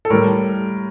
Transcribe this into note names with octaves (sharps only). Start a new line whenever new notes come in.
A4
A2 G3 A#4